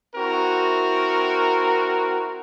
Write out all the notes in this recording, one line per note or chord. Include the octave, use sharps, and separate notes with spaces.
C4 E4 F#4 A#4